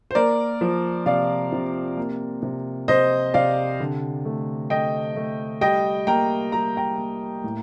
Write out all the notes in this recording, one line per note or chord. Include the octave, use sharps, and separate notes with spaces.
C5
A#3 A#4 D5
F3
C3 D5 F5
C3
A#3
C3
C3 C5 D#5
C3 D5 F5
D3
A3
A3 D#5 G5
A3
G3 D#5 G5
A#3 G5 A#5
G3 A#5
G5 A#5
A#3
A2